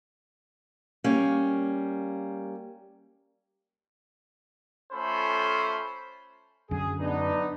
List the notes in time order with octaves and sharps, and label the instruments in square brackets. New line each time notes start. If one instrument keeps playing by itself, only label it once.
[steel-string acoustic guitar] G3 A#3 C#4 F5
[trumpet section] A3 C#4 F4 A4 C5 B5
[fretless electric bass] F#2 D3 [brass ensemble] G#4
[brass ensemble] B3 D4 D#4